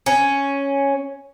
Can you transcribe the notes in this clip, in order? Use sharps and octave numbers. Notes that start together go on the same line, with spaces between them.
C#4